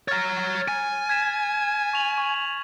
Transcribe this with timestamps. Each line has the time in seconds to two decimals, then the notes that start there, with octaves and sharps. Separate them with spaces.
0.08 C#5 A#5 F6 A6
0.68 G#5
1.09 G#6 B6 E7
1.93 C#6 F7 F#7
2.18 C#6